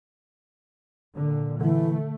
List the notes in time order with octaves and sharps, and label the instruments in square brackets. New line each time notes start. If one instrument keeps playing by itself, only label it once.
[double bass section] A#2 D3
[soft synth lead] D3 [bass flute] E3 [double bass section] A3